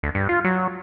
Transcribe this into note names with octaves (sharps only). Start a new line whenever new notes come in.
D2
G2
F4
F#3